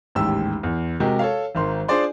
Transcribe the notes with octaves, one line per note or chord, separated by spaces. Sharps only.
A1 D#2 G#2 G4 E6
E2
C3 G#3 F#4 G4 A#4
A4 C#5 F5
G#1 D#3 C6
D4 F4 G#4 C5 D5 C6